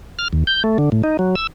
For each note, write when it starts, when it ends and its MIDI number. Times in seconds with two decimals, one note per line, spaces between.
0.19 0.28 89
0.33 0.44 39
0.47 0.63 91
0.64 0.78 57
0.78 0.90 50
0.92 1.02 45
1.04 1.17 63
1.19 1.35 54
1.35 1.47 88